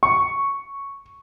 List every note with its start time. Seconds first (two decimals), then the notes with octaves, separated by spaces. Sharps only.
0.03 C#6